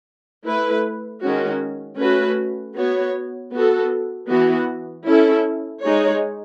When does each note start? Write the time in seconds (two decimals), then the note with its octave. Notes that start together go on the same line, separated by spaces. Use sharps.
0.46 A3 E4 B4
1.22 D#3 G#3 C#4 F#4
1.99 A3 C#4 F#4 B4
2.76 B3 F#4 C#5
3.53 B3 F#4 A4
4.29 E3 B3 F#4
5.06 C#4 E4 A4
5.83 G#3 D#4 G#4 C#5